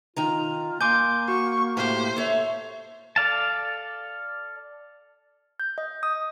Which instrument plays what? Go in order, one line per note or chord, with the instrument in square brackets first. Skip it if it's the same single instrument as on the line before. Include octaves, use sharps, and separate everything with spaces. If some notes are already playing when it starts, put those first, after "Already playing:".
[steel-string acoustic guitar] D#3 D#4 A#5 [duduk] F4
[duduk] A#3 [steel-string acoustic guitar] G#5 [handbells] C6 D6 G6
[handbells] F#4 [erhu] C#6
[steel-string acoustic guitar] A2 G4 [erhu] C5
[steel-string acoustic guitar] A4 C#5 E5
[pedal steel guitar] A4 D5 F5 A5
[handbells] G6
D#5
D#6